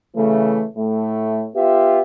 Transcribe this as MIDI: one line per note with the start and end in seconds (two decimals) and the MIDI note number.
0.16 0.66 49
0.16 0.66 52
0.16 0.66 57
0.77 1.47 45
0.77 1.47 57
1.56 2.02 59
1.56 2.02 65
1.56 2.02 67
1.56 2.02 76